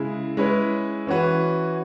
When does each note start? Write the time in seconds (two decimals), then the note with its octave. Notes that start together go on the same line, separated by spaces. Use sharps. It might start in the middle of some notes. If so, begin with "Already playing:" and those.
Already playing: C#3 G#3 E4 G#4
0.37 G#3 C#4 E4 B4
1.07 E3 C#4 F#4 B4